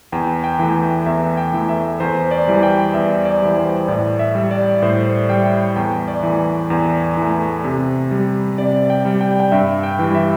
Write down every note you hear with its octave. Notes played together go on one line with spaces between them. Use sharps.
E2 G5
G5
E3 A3
G5
E2 E5
G5
E3 A3
E5
E2 C5
D5
E3 G3
G5
E2 E5
D5
E3 G3
C5
A2 D5
E5
G3
D5
A2 C5
G3 G5
E2 G5
D5
E3 A3
E2
E3 A3
C3
G3
C3 D5
G5
G3
G5
G5
G2 E5
G5
E3 G3
E5